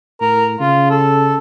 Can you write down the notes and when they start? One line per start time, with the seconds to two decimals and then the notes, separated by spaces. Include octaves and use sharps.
0.21 A2 A#4
0.60 C#3 F4
0.90 A4